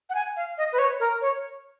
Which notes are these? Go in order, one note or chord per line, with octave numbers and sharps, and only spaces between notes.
F#5
G#5
F5
D#5
B4
C#5
A#4
C#5